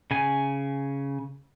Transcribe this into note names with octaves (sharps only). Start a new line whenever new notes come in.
C#3 G#5